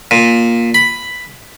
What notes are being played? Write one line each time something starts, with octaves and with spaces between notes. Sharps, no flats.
A#2
B5